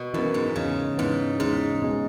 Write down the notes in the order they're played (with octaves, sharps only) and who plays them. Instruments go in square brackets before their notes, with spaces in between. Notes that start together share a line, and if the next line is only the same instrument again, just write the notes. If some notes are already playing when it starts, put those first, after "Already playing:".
Already playing: [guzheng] B2
[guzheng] F#2 [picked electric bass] E3 B3
[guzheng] G#2
[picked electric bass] E2 [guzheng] C#3
[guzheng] G#2 [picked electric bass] E3 B3
[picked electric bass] E2 [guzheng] G#2
[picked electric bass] B2 G#3